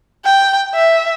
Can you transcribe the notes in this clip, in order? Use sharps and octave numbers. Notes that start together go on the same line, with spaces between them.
G5
E5